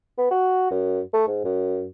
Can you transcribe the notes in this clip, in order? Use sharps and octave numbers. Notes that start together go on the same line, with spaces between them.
B3
F#4
F#2
A3
G#2
F#2